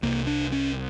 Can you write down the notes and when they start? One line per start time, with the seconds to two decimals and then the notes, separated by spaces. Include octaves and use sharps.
0.02 C2 C3 A#3
0.27 D4
0.52 C#4